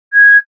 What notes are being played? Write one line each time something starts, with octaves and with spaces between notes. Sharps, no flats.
G#6